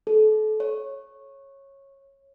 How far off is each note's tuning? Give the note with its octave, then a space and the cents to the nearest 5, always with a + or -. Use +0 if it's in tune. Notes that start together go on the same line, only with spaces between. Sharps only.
A4 -35
C#5 -15